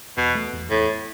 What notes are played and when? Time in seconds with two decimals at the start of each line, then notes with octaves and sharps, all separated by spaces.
0.17 E2 B2
0.35 A3
0.53 E2
0.71 E2 A2